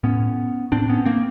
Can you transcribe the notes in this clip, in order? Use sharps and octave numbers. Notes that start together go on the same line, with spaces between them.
A2 B3 C#4
A2 C4 D4
B3 C#4
A#3 C4